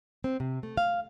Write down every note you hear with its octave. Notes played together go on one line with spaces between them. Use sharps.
C4
C3
A3
F5